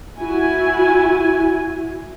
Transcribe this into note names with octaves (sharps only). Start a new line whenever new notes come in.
E4 F#4 G#5